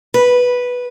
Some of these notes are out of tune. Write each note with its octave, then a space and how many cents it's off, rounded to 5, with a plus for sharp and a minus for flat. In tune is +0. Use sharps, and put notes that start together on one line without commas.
B4 -5